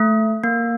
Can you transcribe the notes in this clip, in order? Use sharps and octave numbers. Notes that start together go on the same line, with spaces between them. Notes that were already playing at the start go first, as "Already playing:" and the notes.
Already playing: A3
A#3